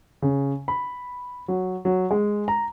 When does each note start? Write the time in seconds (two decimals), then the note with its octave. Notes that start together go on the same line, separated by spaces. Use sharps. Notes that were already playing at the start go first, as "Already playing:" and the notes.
0.22 C#3
0.68 B5
1.48 F#3
1.85 F#3
2.11 G#3
2.48 A#5